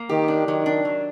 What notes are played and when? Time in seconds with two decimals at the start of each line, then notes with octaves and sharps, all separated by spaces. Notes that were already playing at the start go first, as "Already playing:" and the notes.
Already playing: A#3
0.09 D#3 G4
0.28 D4
0.48 D#3 F#3
0.66 D4
0.85 F#3